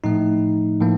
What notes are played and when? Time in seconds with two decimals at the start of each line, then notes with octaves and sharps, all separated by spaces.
0.04 A2 F3 A3 D#4
0.81 A2 F3 A#3